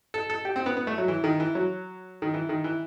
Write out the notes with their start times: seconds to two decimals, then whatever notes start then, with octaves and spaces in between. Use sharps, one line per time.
0.14 A4
0.30 A4
0.45 G4
0.56 C4
0.66 B3
0.77 B3
0.87 A3
0.98 F#3
1.08 E3
1.24 D#3
1.40 E3
1.55 F#3
2.22 D#3
2.34 E3
2.49 D#3
2.64 E3